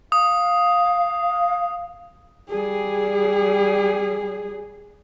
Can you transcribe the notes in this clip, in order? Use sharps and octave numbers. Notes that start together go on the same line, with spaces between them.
F5 D#6
G3 G#4